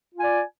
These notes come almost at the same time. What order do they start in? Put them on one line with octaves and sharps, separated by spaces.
F4 G#5 D5